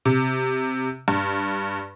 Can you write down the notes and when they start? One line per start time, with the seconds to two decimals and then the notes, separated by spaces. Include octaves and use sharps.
0.05 C3
1.08 G2